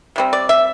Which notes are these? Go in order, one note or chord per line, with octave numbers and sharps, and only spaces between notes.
C3 G3 C4
D5
E5